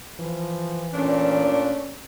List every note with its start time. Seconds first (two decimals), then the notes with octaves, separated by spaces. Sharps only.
0.19 E3 F3
0.94 A#2 A3 C#4 D4